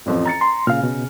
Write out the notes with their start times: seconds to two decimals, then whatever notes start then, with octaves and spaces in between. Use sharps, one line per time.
0.06 A1 F2 F3
0.25 A#5 A6 C#7
0.41 A#5 C6
0.67 A#2 C#3 F5 F6
0.83 B2